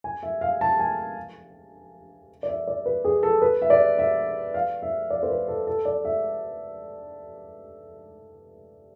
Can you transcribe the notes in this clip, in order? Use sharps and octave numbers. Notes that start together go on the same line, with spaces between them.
G#5
E5
F5
A5
G#5
D5
E5
D5
B4
G#4
A4
B4
E5
D5
E5
F5
E5
D5
C5
B4
A4
A4
D5
E5